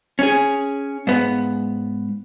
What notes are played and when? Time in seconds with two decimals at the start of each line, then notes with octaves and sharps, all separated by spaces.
0.19 C#4 G#4
1.07 G#2 B3